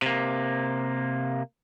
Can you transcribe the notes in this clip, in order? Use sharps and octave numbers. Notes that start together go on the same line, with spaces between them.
C3 A#3